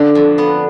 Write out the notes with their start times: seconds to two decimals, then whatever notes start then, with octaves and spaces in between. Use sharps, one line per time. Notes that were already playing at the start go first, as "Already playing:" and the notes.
Already playing: D3 D4
0.15 F2
0.38 B3